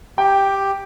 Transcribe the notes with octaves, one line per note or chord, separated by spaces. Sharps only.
G4 G5